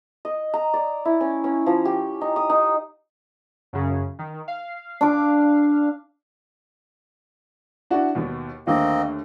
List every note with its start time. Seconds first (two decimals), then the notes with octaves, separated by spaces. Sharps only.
0.25 D#5
0.54 A#5
0.74 D5
1.05 E4
1.21 C#4
1.44 C#4
1.66 F3
1.85 G4
2.21 D#4
2.36 D#6
2.50 D#4
3.73 F#2 C#3
4.19 D#3
4.48 F5
5.01 D4 D6
7.90 D4 E4 F#4
8.15 D#2 B2 D#3
8.67 D#2 D3 A3 A#3 C4 D#5